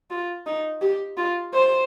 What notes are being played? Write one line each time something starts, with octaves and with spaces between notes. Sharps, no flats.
F4
D#4
G4
F4
C5